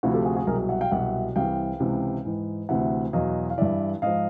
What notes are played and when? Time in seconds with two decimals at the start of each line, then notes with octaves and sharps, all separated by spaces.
0.03 D2 C3 F3 E4 F#4
0.14 G4 A4
0.25 F#4 G#4
0.37 F#4 G#4
0.47 C2 B2 F#3 G#4 A#4
0.69 E5 F#5
0.81 F5 G5
0.91 C2 B2 F#3 E5 F#5
1.36 C2 C3 E3 F5 G5
1.80 C#2 C3 E3
2.25 G#2 E3
2.69 D2 C3 E3 E5 F#5
3.13 E2 B2 F#3 D#5 F5
3.50 F5
3.58 G2 E3 D5 E5
4.02 G#2 F3 D#5 F5